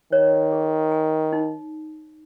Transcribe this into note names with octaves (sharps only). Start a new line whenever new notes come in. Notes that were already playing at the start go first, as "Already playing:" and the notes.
D#3 C#5
G#4
G#5
D#4